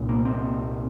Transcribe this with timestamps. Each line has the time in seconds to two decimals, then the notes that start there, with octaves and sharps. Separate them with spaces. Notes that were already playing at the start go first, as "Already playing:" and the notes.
Already playing: C2 A#2
0.09 A#3
0.25 C4